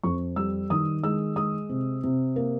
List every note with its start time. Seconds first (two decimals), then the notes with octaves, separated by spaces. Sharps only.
0.04 F2 C#6
0.36 G3 E6
0.70 D#3 D#6
1.04 G#3 E6
1.36 G#3 D#6
1.69 C3
2.04 C3
2.36 A#3